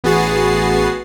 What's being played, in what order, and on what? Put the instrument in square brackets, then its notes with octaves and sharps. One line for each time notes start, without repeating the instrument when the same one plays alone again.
[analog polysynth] A1 B3 F#4 G#4 A6 C7